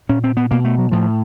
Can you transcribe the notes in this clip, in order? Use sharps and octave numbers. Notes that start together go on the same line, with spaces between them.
A#2 C#4
C4
B3
B2 A#3
A3
F#3
A2 F3